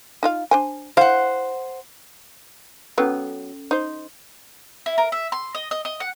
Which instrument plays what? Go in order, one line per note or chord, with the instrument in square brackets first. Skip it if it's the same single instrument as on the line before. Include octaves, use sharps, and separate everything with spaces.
[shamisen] D#4 F4 F5
D4 C5 G#5
[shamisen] E4 F5 [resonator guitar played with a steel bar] C5 F#5
[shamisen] F#3 B3 [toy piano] C#4 A4
[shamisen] D#4 C5
[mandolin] E4
A#4
E5
C6
D#5
D#5
D#5
F#5